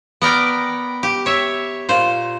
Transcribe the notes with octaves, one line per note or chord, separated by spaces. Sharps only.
B3 A#4 D5 G5
G4
C#5 E5
A#2 C5